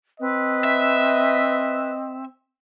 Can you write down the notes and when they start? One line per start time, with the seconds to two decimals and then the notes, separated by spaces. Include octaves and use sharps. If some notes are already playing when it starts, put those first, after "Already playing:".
0.20 C4 B4 D#5
0.64 E5